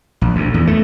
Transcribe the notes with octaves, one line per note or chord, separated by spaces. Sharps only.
A#1
D2
E2
A3